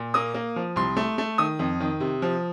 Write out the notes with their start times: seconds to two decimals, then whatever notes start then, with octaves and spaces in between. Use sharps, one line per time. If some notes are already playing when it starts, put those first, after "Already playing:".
Already playing: A#2
0.14 A#3 D#6
0.34 A#3
0.56 F3
0.76 C2 C6
0.96 A3
1.18 A3
1.38 D#3 D#6
1.59 F2
1.80 D#3
2.00 C3
2.22 F3